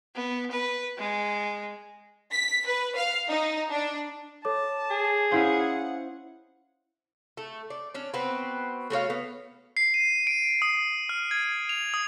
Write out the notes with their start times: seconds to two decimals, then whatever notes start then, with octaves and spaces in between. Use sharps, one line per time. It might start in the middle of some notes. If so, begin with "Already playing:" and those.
0.15 B3
0.51 B4
0.98 G#3
2.32 B6
2.66 B4
2.96 F5
3.28 D#4
3.70 D4
4.45 A4 C#5 A5 D6
4.90 G#4
5.31 C#4 E4 C5 F5 F#5
7.37 A3
7.70 D5
7.94 C#4 D4
8.14 B3 C4 F#4 B4
8.90 A3 F#4 C#5 F5
9.10 B3
9.77 C7
9.94 D#7
10.27 D7
10.62 D#6
11.09 F6
11.31 G#6
11.69 F7
11.94 D#6